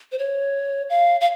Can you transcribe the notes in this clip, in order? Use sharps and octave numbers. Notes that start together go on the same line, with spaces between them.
C5
C#5
F5
F5